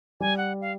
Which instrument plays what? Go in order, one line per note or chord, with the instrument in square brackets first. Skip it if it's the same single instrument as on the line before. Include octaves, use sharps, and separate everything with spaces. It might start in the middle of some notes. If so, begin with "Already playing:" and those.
[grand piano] G3 [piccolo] G#5
[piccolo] F#5
F5